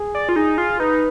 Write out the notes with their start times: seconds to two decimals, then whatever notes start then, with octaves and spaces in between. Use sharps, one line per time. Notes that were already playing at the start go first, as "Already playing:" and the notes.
Already playing: G#4
0.15 D5
0.29 F4
0.36 D#4 G#4
0.58 F4
0.79 D#4 B4